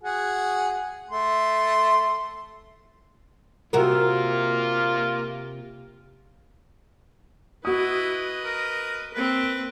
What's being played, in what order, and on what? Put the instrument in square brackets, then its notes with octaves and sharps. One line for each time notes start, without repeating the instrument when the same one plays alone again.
[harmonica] F#4 G#4
A3 C6
[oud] C3 F#4 A#4 [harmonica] A#3 F4
[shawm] E4 [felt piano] F#4 D#6 [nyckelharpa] B4 D#5
[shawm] A#4
[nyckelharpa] A#3 C4 [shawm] B4